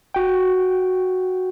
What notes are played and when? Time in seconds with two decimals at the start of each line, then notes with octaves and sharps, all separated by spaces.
0.14 F#4 G5